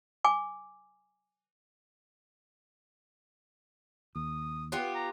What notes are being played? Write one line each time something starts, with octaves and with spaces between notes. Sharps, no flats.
G#5 D6
D#2 D#6
B3 F4 G4
A#5